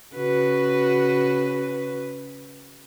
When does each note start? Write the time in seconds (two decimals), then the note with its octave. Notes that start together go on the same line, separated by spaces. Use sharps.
0.15 C#3 F#4 B4